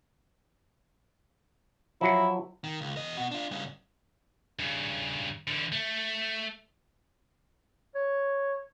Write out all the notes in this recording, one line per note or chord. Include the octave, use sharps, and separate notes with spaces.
F3 F#3 E4
D#3
C#2
E2 D#5
B2 F#4
D4 F4
G2 C#3
G2 C#3
D3 E3
A3
C#5